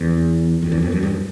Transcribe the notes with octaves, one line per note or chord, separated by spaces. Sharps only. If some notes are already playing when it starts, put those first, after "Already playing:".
Already playing: E2
F2
E2
F2
F#2
G2